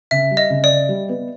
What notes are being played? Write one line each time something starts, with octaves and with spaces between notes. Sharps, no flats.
C#3 E5
G3
D#5
C#3
D5
C#3
G3
B3